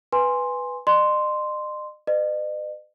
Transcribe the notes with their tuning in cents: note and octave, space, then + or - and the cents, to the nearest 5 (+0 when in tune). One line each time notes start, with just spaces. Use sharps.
B4 +0 G#5 -10 C6 +5
D#5 -45 C6 -5
B4 +35 D#5 -45